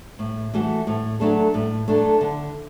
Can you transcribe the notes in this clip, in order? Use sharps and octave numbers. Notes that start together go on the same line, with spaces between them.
A2
E3 A3 F#4 A4
A2
F#3 A3 D4 A4
A2
F#3 A3 D4 A4
D3